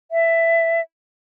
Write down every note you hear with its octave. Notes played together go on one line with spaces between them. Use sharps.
E5